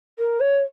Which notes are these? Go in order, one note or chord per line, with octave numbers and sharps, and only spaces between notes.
A#4
C#5